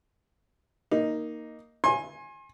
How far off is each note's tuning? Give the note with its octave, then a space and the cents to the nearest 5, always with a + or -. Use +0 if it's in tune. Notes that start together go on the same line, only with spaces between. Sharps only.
A#3 +0 D#4 +0
G#5 +0 C6 +40